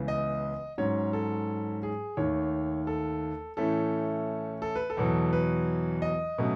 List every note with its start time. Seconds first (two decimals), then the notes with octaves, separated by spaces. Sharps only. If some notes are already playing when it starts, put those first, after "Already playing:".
Already playing: C#2 C#3 E3 B3
0.08 D#5
0.78 G#2 F#3 C#4 C#5
1.13 A4
1.83 G#4
2.17 D#2 D#3 A3 C#5
2.87 A4
3.57 A2 E3 A3 C#4 A4
4.62 A4
4.76 B4
4.90 A4
4.97 E2 B2 F#3 B3
5.33 B4
6.02 D#5
6.38 B2 F#3 A3 C#4